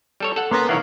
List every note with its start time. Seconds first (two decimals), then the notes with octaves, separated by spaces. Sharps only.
0.20 G3 A4 C#5
0.36 A4 F#5
0.51 A#3 B3 C#4 A#4 C6
0.69 B1 D#3 E3 A#3 C#5 F5 F#5